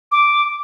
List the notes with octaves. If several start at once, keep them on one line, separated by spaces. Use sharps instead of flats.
D6